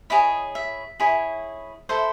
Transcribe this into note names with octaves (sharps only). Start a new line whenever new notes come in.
E4 G#4 C#5 D#5
E5
E4 G#4 C#5
E4 A4 C5